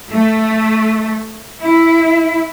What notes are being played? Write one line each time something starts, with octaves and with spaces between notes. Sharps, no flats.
A3
E4